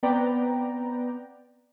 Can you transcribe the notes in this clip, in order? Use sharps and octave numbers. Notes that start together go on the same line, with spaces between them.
B3 C4 B4 D5 G5 A#5